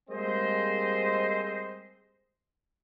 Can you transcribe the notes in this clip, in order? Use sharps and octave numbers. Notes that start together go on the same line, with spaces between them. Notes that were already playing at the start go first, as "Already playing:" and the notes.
G3 G#3 A#3 C4 C5 D#5